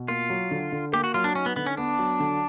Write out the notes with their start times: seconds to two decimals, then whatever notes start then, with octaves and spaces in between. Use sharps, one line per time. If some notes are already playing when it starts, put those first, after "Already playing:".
Already playing: B2
0.08 A#3 F4
0.30 F#3
0.51 D3
0.72 D3
0.93 A#3 G4
1.04 F#4
1.14 F#3 F4
1.24 D4
1.35 C#4 D#4
1.46 B3
1.56 D3 B3
1.66 C#4
1.77 B3 D4
1.99 F#3
2.20 D3